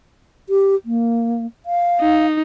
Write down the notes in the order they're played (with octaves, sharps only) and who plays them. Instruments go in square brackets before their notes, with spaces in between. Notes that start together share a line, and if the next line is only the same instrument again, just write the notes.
[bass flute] G4
A#3
F5
[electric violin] D#4